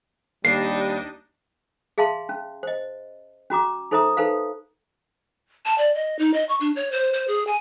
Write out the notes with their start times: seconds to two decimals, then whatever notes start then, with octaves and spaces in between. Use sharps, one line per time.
0.45 D#2 G3 D4 D#4 C7
1.98 G#4 E5 F5 A5 C6
2.29 C#4
2.63 C5 D#5
3.50 C#4 F#4 A#5 D6
3.91 D#4 A4 C5 E5 A#5 D#6
4.17 D#4 A4 B4 C5 F5
5.66 A5
5.78 D5
5.95 D#5
6.19 D#4
6.34 D#5
6.49 C#6
6.61 D4
6.76 C#5
6.92 C5
7.14 C5
7.28 G#4
7.47 G#5